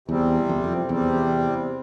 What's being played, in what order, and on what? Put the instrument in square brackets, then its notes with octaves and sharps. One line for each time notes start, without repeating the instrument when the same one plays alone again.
[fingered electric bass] E2 [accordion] C3 G3 C4
[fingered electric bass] F2
E2
F2
[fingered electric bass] E2 [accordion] C3 G3 C4